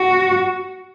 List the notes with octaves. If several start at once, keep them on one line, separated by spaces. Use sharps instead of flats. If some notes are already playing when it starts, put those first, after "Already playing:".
Already playing: F#4